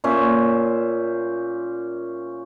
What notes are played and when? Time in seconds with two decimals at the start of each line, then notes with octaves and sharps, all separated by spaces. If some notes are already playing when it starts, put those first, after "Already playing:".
0.04 A#2 C#4 C5 E5